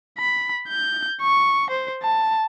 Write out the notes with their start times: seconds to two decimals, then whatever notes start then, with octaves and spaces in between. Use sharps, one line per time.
0.18 B5
0.68 G6
1.21 C#6
1.70 C5
2.02 A5